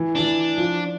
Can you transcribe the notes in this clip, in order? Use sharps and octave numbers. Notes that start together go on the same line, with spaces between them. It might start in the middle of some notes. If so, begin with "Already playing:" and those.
Already playing: E3
E3 D4
F3